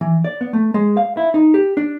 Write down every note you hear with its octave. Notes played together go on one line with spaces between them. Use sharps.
E3
D5
B3
A3
G#3
F5
E4
D#4
G4
D4